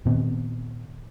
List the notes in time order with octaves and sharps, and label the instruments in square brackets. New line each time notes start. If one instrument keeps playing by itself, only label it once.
[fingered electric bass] A#2 D#3 B3 C4